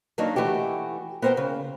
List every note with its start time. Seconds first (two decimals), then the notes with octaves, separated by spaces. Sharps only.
0.18 D#3 F#3 A#3 D4 D#4
0.36 E3 A3 F#4 G4
1.22 B3 A#4 C5 F#5 G5
1.37 C#3